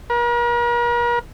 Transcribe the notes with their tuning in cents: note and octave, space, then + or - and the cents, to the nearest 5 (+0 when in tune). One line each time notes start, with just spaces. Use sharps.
A#4 +45